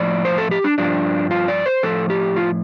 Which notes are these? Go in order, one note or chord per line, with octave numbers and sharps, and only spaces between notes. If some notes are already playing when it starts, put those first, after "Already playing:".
Already playing: A2 F3 D5
C5
A4
G4
D4
G2 F3 D4
F4
D5
C5
A2 F3 A4
G4
F4